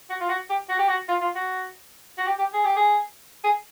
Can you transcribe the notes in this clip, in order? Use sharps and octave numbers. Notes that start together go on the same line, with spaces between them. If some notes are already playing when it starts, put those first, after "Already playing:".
F#4
F4
F#4
G4
F#4
G4
F#4
F4
F4
F#4
F#4
G4
G4
G#4
G4
G#4
G#4